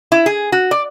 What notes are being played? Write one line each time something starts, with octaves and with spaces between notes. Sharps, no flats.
E4
G#4
F#4
D5